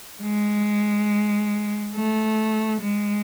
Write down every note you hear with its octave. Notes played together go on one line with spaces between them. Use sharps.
G#3
A3
G#3